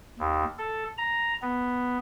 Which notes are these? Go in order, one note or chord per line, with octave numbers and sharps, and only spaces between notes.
D#2
A4
A#5
B3